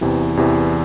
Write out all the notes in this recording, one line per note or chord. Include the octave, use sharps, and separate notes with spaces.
E2 C3 E3
E2 C3 E3